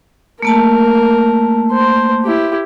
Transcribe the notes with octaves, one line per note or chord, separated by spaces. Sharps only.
A3 A#3 A#4 A5
C5
E4 G4